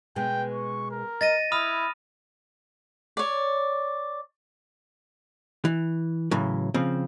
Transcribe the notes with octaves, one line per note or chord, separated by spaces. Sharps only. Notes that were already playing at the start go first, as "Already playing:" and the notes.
B2 G#3 G5
C#6
A#4
D#5 A6 A#6 D#7
E4 B5 D#6 F6
C#5 D5
E3
A2 C#3 E3 F#3
C#3 F3 C4